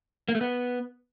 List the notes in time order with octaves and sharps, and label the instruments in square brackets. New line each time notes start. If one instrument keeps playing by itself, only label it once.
[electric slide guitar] A#3
A3
B3